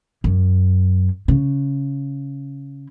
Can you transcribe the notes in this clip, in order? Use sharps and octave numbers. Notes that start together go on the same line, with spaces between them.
F#2
C#3